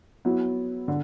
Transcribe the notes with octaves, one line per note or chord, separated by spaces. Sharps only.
F#3 B3 E4
D3